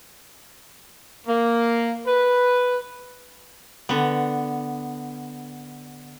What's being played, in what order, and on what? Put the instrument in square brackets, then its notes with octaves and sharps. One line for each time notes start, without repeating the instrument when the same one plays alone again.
[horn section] A#3
B4
[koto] D3 B3